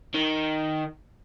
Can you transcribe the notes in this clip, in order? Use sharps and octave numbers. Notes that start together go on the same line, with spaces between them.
D#3